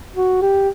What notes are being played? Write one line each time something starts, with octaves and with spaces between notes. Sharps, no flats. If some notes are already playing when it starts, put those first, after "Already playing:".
F#4
G4